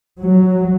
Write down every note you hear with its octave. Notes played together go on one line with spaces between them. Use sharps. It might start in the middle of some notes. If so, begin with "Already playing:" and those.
F#3